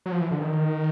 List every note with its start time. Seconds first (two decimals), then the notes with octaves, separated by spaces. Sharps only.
0.06 F#3
0.12 F3
0.21 E3
0.31 D3
0.41 D#3